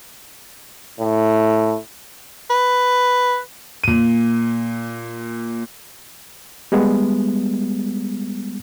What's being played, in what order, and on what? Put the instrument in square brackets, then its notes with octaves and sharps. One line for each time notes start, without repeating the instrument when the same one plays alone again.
[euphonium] A2
[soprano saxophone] B4
[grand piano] A#2 D#7
[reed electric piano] G3 G#3 B3